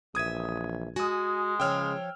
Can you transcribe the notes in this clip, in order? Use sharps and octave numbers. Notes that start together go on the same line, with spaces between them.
A#1 E3 E5 D#6 G#6 D#7
G#3 F#4 G#5 D#6
C#3 F3 C#5 F5 G5 E6 F6